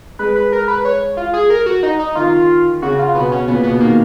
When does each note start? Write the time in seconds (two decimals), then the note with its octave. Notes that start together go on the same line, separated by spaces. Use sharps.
0.19 G#3 B4
0.36 B4
0.52 A#4
0.68 B4
0.85 C#5
1.17 F4
1.33 G#4
1.50 A#4
1.66 F#4
1.83 D#4
1.99 D#4
2.15 D#3 F4
2.82 C#3 F#4
2.99 F4
3.15 B2 B3
3.32 C#4
3.48 A#2 B3
3.63 B2 B3
3.80 D#3 A#3